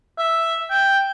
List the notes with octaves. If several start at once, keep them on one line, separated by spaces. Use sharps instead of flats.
E5
G5